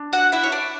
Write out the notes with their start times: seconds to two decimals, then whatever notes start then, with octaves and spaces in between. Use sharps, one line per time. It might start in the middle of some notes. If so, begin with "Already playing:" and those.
Already playing: D4
0.13 F#4 F#5
0.32 E4 E5
0.43 C#5
0.52 D4 D5